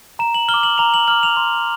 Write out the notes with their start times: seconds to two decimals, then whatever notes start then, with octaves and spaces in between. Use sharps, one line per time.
0.19 A#5 E7
0.34 F#7
0.48 F6 G7
0.54 D6
0.63 F#7
0.78 A#5 F7
0.94 F#7
1.08 D6 F6 F#7
1.23 F7
1.37 C6